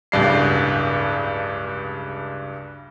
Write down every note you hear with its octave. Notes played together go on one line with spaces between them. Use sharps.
D1 C#2 G2 C7